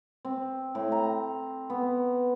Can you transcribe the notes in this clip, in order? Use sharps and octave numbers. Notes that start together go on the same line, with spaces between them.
C4
A2
A#5
B3